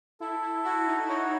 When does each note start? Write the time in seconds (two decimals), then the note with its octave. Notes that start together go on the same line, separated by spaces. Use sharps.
0.20 E4 A4
0.42 E4
0.65 E4 F#4
0.87 D#4
1.05 E4
1.09 D#4 C#5